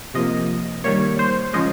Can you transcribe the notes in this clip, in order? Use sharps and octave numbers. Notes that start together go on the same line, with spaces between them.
C3 F3 A#3 D#5
D#3 G3 A#3 C#5
C5
C#3 F3 G#3 D#5